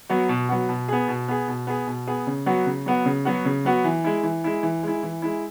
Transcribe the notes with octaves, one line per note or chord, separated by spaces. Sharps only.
F#3 B3 F#4
B2
F#3 B3 F#4
B2
B3 G#4
B2
B3 G#4
B2
B3 G#4
B2
B3 G#4
C#3
F#3 B3 F#4
C#3
F#3 B3 F#4
C#3
F#3 B3 F#4
C#3
F#3 B3 F#4
E3
G#3 E4
E3
G#3 E4
E3
G#3 E4
E3
G#3 E4